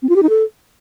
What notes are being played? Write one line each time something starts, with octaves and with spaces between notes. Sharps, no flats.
C4
F4
G4
D#4
A4